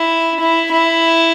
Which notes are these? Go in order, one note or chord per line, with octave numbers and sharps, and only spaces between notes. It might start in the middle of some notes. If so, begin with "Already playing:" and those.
Already playing: E4
E4
E4